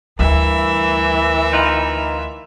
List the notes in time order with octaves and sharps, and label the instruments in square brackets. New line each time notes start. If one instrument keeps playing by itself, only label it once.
[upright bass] D2 [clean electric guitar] G2 [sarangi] E3 [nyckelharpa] A#4 E5
[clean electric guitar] D#4 F4 B4